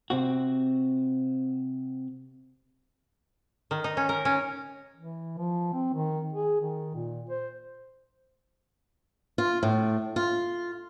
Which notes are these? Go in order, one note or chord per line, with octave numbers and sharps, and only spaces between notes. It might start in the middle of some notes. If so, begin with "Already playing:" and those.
C3 C4 F#4
D#3
D#4
C#4
A#4
C#4
E3
F3
C4
D#3
G#4
D#3
A#2
C5
F4
A2
F4